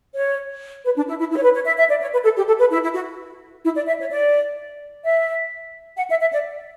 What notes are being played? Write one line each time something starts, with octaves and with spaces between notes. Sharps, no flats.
C#5
B4
D4
E4
E4
E4
C#5
B4
C#5
E5
E5
D5
C#5
B4
A4
G4
A4
B4
E4
E4
F#4
E4
D5
E5
C#5
D5
E5
F#5
E5
E5
D5